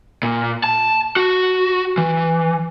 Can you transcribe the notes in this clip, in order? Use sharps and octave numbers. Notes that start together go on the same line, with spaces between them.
A#2
A5
F#4
E3